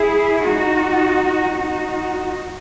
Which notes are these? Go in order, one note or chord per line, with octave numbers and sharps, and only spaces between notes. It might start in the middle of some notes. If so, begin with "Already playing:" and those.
Already playing: E4 G#4
D#4 F#4
D#4 F#4